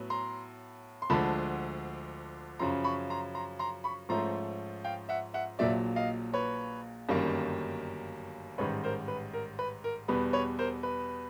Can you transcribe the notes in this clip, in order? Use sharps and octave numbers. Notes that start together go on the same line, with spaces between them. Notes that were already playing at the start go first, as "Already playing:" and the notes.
Already playing: A2 F#3 B3
A#5 C6
C6
D2 D3 F3 G#3 A5 B5
F#2 C#3 F3 A#5 C6
B5 C#6
A#5 C6
A#5 C6
A#5 C6
B5 C#6
G#2 F3 A3 C#4 A#5 C6
F5 G5
E5 F#5
E5 F#5
A#1 A#2 F#3 D5 E5
D#5 F5
B4 C#5
G1 F#2 D#3 G3 A#3
A1 G#2 D#3 G3 B4 C#5
A#4 C5
B4
A#4
B4
A#4
E2 B2 G3 B3 B4
B4 C#5
A#4 C5
B4